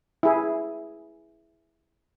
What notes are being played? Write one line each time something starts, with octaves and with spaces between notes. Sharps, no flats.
E4 G#4